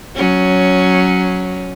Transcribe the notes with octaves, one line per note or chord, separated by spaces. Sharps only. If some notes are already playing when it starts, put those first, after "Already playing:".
F#3 C#4